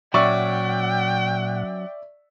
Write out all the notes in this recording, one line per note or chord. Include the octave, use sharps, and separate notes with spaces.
A#2 F#3 C#4 D5 E5 F#5 G5 C#6